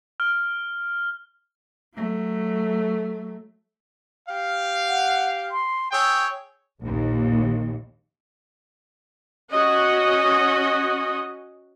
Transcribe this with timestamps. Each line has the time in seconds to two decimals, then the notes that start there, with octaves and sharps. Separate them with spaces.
0.20 F6
1.95 F#3 A3
4.27 G4 F5
4.87 F#5
5.51 C6
5.92 G#4 C#5 G5 E6
6.82 A#1 D#2
9.51 C#4 F#4 D#5